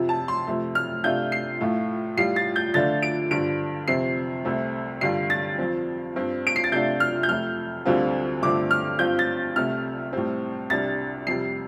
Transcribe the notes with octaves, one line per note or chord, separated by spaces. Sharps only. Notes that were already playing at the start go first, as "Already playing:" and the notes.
Already playing: F2 C3 F3
A5
C6
F2 C3 A3
F6
C3 A3 D4 F4 G6
C7
A2 A3 F4
A2 G3 F4 C7
A6
G6
F2 D3 A3 D4 F4 A6
D7
G2 D3 F3 D7
F2 C3 F3 C4 C7
C2 C3 A3 C4
G2 D3 G3 F4 C7
A6
F2 F3 C4
G2 F3 C4
D7
C7
A6
C3 A3 D4 F4 G6
F6
G6
F2 C3 A3 F6
D2 D3 G3 C4 F4
G2 D3 F3 A3 C4 D6
F6
G2 F3 C4 F4 G6
A6
C2 C3 A3 F6
A2 G3 C4
C2 C3 G3 D4 A6
F2 C3 G3 C7